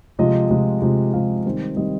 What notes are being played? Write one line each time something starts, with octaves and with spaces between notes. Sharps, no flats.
C3 F3 G#3 D#5
C3 F3 G#3
C3 F3 G#3
C3 F3 G#3 F5
D#3 G3 C4
D#3 G3 C4 D#5